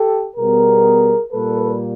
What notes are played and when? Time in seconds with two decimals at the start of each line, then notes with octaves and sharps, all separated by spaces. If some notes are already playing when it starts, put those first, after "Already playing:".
Already playing: G4 A4
0.37 B2 G3 B3 G#4 A#4
1.31 A#2 G3 A#3 A4 B4